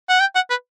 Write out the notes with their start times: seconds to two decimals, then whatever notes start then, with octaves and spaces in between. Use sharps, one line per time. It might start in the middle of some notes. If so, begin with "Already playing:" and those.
0.09 F#5
0.20 G5
0.35 F#5
0.50 B4